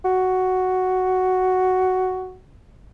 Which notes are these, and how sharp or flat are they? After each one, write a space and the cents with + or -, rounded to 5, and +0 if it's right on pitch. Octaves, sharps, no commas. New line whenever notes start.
F#4 +5